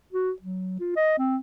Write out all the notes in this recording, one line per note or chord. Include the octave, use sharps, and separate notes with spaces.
F#4
F#3
F4
D#5
C4